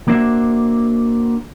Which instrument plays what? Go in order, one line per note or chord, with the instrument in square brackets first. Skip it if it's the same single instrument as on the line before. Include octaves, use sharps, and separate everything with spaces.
[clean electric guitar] A#3 D4 F#4 C5 E5